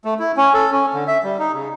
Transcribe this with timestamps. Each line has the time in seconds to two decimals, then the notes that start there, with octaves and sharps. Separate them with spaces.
0.05 A3
0.19 E4
0.37 C#4
0.54 A4
0.72 C#4
0.94 D3
1.08 E5
1.24 G3
1.39 D#4
1.54 C#3